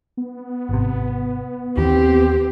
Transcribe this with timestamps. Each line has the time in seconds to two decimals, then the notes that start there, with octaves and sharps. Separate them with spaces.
0.17 B3
0.69 G#1 C3
1.77 D#2 D#3 E3 C4 G4